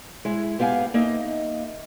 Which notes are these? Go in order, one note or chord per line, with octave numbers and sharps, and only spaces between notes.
G#3 E4
G#2 B3 G4 F5 G#5
A#3 D#4 D#5 E5